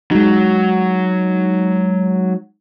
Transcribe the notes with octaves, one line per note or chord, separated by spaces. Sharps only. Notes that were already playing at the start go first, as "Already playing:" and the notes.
F#3 G#3 D#4